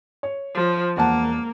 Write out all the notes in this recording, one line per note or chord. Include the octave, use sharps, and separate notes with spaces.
C#5
F3
E1 A#3 F#5 A5